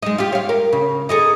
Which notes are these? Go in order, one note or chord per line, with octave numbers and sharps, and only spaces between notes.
G#3 D#4
F4 G4
C#5 F5
A#4
C#3
D#4 G#4 A4